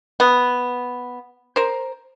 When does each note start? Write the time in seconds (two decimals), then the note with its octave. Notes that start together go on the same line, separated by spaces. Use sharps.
0.20 B3
1.56 A#4 C5